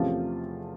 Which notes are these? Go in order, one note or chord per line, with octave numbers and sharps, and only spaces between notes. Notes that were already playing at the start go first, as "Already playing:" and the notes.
Already playing: E2 C3 F3 A3 C#4 F4 G4